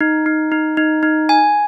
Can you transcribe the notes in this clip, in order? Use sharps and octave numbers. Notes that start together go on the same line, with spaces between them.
D#4
D#4
D#4
D#4
D#4
G#5